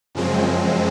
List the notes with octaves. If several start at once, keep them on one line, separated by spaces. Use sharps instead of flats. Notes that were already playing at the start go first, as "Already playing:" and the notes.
F#2 C#3 F3 G#3 C4